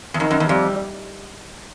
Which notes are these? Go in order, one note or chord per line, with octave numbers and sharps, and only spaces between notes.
E2
F2 D#3
F#2
E2
F2 G3